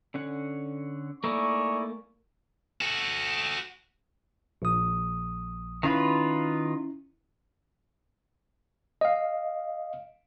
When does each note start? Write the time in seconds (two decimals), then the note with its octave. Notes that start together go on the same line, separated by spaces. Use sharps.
0.14 D3 C#4 F#5
1.24 A3 A#3 D#4 E4 A#4 D5 G#5 C#6
2.81 F#4 A4
4.62 A#1 D#6
5.83 D#3 C#4 E4 F4 B4
9.01 D#5 F5